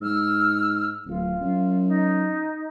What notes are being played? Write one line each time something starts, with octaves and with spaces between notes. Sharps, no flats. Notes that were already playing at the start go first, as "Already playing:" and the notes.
G#2 E6 F6
D1 F4
F#2
D#4